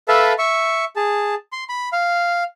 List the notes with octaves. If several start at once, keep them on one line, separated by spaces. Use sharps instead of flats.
A4 B4 E5 F5 A5
E5 C#6
G#4 A5
C6
B5
F5